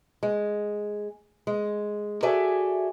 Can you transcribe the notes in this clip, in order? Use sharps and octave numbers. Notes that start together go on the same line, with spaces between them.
G#3
G#3
F#4 G#4 A4 D5 E5 G#5